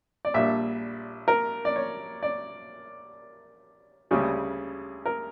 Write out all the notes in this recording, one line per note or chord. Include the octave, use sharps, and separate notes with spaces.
D5
A#1 A#2 G3 D4 E5
A#4
D5
C#5
D5
D2 C#3 G3 C#4
A#4